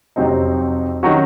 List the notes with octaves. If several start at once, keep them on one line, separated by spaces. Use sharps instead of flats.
F2 C3 F#3 C4 D#4
D#3 F#3 C#4 F#4